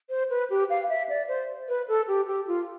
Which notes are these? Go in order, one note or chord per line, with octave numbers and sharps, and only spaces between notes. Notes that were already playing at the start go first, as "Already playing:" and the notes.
C5
B4
G4
F5
E5
D5
C5
B4
A4
G4
G4
F4